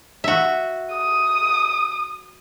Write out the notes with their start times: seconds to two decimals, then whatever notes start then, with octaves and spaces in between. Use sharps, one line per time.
0.24 F#4 E5
0.94 D#6